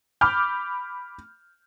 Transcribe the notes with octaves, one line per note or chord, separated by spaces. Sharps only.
B5 D6 F6 G6